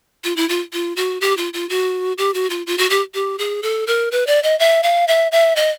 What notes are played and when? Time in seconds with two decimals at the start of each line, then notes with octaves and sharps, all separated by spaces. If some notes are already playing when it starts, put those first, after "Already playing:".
0.24 F4
0.36 E4
0.49 F4
0.73 F4
0.96 F#4
1.21 G4
1.37 F4
1.53 F4
1.69 F#4
2.18 G4
2.34 F#4
2.50 F4
2.67 F4
2.78 F#4
2.90 G4
3.14 G4
3.39 G#4
3.63 A4
3.87 A#4
4.12 B4
4.27 D5
4.43 D#5
4.59 E5
4.83 F5
5.08 E5
5.32 E5
5.56 D#5